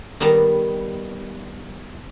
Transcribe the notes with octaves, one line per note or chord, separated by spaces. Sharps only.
D#3 G3 B3 A5 A#5